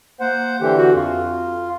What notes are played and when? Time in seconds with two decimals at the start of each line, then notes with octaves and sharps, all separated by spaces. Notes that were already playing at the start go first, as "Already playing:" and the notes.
0.20 A#3 C5 F#5
0.60 D3 E3 G4
0.78 F#4
0.95 F2 F4